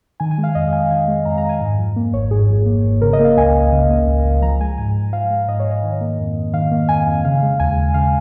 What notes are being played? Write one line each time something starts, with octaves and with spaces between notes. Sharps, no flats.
D#3 G#5
G#5
G#3
F5
F2 D#5
F2 G#5
D#3 G#5
G#3
F2 A#5
A#5
F2
G#5
G#2
F3
A#3
G#1 C#5
G#2 G#4
F3
A#3
G#1
C#3 A#4
D#5
A#3
F5
C#2 G#5
C#2
C#3
A#3
C#2
C#2
F3 A#5
G#3 G#5
G#2 G#5
G#2
F3 F5
G#3
G#2 D#5
C#5
G#2
D#5
D#3
A#3
F2
F2
D#3 F5
A#3
F2 G#5
F2
C#3 F5
G#3
D#2 G#5
D#2
C#3 F5